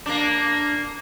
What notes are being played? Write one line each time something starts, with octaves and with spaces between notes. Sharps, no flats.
A#3 D4